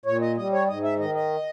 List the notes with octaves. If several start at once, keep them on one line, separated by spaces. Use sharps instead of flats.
A#2 C#5
D#5
G3 D#5
C#5
G#2 D#5
E5
D#3 D#5
D#5